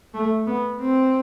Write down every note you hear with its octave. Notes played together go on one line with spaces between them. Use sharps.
A3
B3
C4